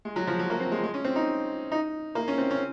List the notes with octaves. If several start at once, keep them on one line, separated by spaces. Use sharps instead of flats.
G#3
F#3
F3
F#3
A#3
C4
G#3
G#3
C#4
C4
D#4
D#4
A#3
C#4
C4
C#4